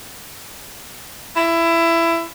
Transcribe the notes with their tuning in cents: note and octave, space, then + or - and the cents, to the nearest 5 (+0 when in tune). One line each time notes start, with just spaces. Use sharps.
E4 +20